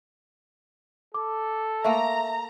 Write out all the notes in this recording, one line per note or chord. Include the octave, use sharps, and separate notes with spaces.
A4 D6
A3 A#3 E5 A#5